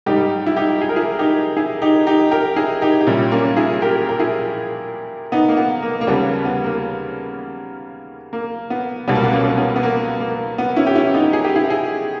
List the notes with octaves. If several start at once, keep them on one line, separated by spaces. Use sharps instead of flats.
G#2 G3 D#4 G4
E4
D#4 G4
G#4
A#4
E4 G#4
D#4 G4
E4 G#4
D#4 G4
D#4 G4
G4 A#4
E4 G#4
D#4 G4
G4
A#2 G3 C#4 E4
A#3 C#4
E4 G#4
G4 A#4
A#4
E4 G#4
B3 D#4
A#3
B3
A#3
A#3
D#2 C#3 G3 B3
B3
A#3
A#3
B3
C#2 B2 G3 B3
A#3
B3
A#3 C#4
C#4
B3
B3
A#3
A#3
B3
C#4 E4
G4
C#4 E4
B3 D#4
G#4
G4
E4 G#4
E4 G#4